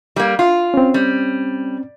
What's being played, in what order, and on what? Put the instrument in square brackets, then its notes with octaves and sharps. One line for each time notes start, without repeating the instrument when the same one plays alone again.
[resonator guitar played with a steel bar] G3 A#3
F4
[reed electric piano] C4 C#4
[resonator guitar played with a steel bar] G3